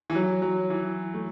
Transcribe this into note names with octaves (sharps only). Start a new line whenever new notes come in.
E3
F#3
F#3
E3
A3